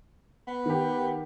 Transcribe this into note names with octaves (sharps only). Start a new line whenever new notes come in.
B3
D#3 G4